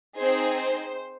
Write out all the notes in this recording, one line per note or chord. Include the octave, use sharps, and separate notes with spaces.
C4 D#4 G#4 C5
C5